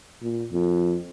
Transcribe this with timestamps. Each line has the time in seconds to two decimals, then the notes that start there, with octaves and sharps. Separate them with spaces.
0.22 A#2
0.52 F2